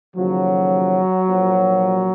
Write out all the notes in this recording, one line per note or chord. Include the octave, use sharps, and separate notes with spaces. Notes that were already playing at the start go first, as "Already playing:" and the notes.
D#2 C#3 F3 F#3
A#1 A#2 F3